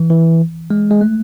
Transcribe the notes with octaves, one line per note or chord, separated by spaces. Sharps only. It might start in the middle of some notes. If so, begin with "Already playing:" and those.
Already playing: E3
E3
G#3
G#3
A3